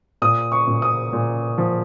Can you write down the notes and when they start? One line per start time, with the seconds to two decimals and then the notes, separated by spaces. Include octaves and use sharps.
0.22 A#2 D#6
0.52 C#6
0.67 A#2
0.82 D#6
1.13 A#2
1.58 F3